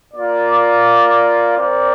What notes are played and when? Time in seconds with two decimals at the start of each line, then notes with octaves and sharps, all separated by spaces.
0.14 A#3 F4 D5
1.57 C4 A#4 D5